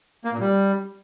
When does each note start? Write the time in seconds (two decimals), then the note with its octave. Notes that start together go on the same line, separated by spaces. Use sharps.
0.25 A#3
0.32 A#2
0.40 G3